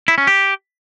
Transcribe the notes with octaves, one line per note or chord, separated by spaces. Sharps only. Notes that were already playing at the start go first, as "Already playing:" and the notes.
E4
C#4
G4